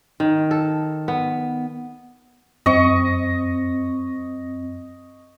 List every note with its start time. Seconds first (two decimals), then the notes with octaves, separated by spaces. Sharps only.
0.20 D#3
0.51 A4
1.08 B3
2.66 F#2 C4 D#5 C#6